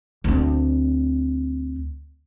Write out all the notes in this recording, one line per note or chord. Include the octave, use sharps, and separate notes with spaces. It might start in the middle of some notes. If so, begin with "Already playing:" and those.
D2 C4